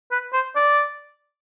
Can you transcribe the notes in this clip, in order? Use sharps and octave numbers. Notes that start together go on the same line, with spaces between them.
B4
C5
D5